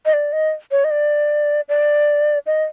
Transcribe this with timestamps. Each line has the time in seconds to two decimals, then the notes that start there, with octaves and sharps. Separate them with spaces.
0.06 D#5
0.13 D5
0.33 D#5
0.71 C#5
0.84 D#5
0.91 D5
1.69 D5
2.46 D#5